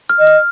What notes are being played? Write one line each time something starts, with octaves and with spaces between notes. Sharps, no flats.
F6
D#5
F6